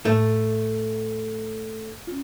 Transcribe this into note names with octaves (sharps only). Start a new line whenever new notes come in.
A2 A3
C#4 F4